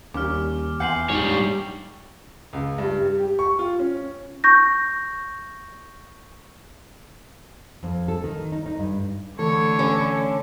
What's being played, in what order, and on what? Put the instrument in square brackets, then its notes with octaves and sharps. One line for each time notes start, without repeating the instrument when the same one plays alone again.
[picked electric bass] D#2 [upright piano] G3 C#4 [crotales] D6 F6
[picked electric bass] E2 [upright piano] F#5 G#5 C6 [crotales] G6 C7 F#7
[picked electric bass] G#2 [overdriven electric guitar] G3 C#5 [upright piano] G#3 D4 D#4
[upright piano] C#2
G2
G3
G4
C#6
F4
C#4
[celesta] C#6 G6 A#6
[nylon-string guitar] F2
A4
D#3
D#4
D#4
G2
[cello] D3 [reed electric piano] E3 A3 A4 [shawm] C#5
[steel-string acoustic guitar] C#4